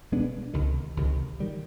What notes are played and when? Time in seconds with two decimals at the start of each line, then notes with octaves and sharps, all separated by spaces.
0.12 B2 G#3 B3 D4
0.54 C#2 C3 D#3
0.97 C#2 C3 D#3
1.40 D#3 G3